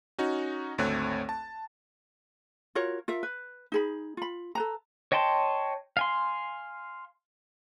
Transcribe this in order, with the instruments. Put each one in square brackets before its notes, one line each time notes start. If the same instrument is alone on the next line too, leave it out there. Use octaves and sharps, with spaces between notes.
[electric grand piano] C#4 D#4 F#4
G#1 D2 A3 C4 C#5 F#6
A5
[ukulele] F4 F#4 A#4 C#5
F4 A#4 E5
B4
D#4 G#4 B5
F4 B5
A4 B4 A#5
[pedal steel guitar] C#5 D#5 G5 A5 C6
F5 G#5 C6